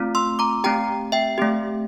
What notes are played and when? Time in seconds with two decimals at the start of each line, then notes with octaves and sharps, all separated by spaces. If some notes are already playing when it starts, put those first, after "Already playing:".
Already playing: A3 C4 F4
0.15 C6 E6
0.39 A#5 D6
0.64 A3 C4 G4 G5 A#5
1.12 E5 G5
1.38 A3 C4 G4